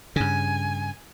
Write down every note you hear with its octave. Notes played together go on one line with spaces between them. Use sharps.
G2 C#3 G#5